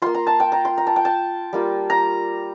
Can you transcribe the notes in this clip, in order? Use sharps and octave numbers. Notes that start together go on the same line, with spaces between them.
A#3 F4 C6
A#5
A5
G5
A#5
C6
A#5
A5
G5
A5
G3 A#3 F4
A#5